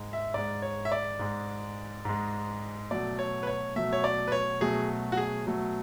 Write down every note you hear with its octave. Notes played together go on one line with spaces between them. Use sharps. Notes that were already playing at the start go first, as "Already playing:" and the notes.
Already playing: G#2 G#3
E5
G#2 G#3 D5
C#5
E5
D5
G#2 G#3
G#2 G#3
B2 F#3 A3 D5
C#5
B4
C#5
B2 F#3 A3 E5
C#5
D5
B4
C#5
B2 F#3 A3 G#4
F#4
G#4
B2 F#3 A3